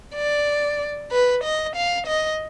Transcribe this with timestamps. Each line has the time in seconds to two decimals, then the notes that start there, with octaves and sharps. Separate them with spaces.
0.15 D5
1.12 B4
1.44 D#5
1.76 F5
2.07 D#5